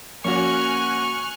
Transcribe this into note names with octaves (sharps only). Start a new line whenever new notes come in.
F3 A#3 C#4 F#4 G#5 C#6 F6 F#6